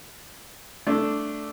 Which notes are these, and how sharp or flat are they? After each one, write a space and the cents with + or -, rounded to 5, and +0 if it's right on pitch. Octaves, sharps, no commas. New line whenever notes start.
A3 +0 D4 +0